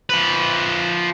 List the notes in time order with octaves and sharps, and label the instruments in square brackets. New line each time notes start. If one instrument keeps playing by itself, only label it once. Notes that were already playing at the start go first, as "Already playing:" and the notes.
[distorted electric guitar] F3 B4